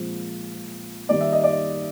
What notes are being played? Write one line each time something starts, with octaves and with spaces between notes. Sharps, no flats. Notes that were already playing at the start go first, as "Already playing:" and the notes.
Already playing: A#2 F3 G#3 C4
D#3 G3 A#3 D#4 D5
E5
D#5
D5